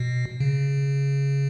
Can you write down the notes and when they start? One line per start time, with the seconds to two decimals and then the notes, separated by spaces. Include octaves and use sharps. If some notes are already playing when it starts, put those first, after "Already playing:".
Already playing: B2
0.40 C#3